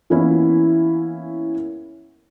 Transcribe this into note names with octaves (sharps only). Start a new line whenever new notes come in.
E3 A#3 B3 C#4 E4